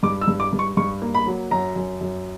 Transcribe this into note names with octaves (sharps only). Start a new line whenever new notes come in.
G2 D6
E6
G2
D6
G2
C#6
G2 C#6
A#3
B5
F#3
F#2 A#5
F#2
F#2